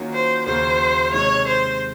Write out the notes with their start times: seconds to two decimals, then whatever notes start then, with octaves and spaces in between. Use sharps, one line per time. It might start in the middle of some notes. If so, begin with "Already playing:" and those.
Already playing: D#3 F#3 A#3 C#4 F4
0.13 C5
0.46 D#2 C#3 F#3 A#3 C5
1.13 C3 D#3 G#3 C#5
1.48 C5